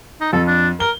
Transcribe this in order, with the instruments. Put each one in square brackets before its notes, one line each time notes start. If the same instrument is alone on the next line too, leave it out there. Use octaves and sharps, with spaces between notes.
[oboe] D#4
[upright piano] F2 [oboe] A4
[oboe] D4
[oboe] A#4 [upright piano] G7